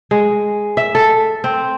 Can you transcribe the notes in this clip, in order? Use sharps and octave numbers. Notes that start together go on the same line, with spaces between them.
G#3
E5
A4
C4